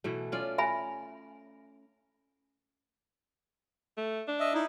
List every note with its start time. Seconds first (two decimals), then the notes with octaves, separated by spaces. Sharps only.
0.04 B2 E3 A3
0.32 C#4 F4 D5
0.58 E5 G#5 B5
3.98 A3
4.28 D4
4.40 D#5 E5
4.54 D#4 E4